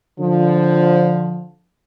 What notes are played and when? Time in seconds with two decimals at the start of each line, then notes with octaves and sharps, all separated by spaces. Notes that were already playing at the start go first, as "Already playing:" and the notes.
0.19 D3 F3